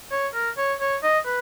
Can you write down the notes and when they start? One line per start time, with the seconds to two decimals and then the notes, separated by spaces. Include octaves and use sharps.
0.12 C#5
0.34 A#4
0.58 C#5
0.81 C#5
1.03 D#5
1.26 B4